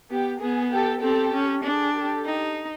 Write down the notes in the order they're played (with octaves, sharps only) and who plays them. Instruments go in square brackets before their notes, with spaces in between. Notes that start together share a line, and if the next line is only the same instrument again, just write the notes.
[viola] B3 [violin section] G4
[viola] B3 [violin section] G#4
[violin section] G4 A4
[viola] C4 [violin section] G4 A4
[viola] C#4
[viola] D4 [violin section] G#4
[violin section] G4 A4
[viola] D#4